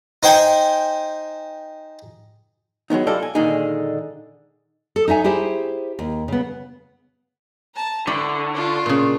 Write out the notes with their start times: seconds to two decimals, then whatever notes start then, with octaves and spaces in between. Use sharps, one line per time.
0.23 D#4 C5 G5 G#5
2.90 F#3 G#3 B3 D#4
3.07 E4 F4 G4 A4 D5 D#5
3.23 G#5
3.35 A#2 D3 D#3 G#3 D#4 G#4
4.96 A4
5.08 D#4 C#5 E5 G#5
5.24 E4 G4 G#4 C5
5.99 D#2
6.28 C#3 B3
7.75 A5 A#5
8.07 D3 E4 D5 G5 C#6
8.54 D4 F4
8.86 A#2 C#3